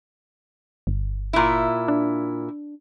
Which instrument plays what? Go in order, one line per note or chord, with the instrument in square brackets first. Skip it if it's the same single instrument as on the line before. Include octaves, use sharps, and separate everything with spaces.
[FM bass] G1
[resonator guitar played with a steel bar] A#2 E4
[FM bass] D4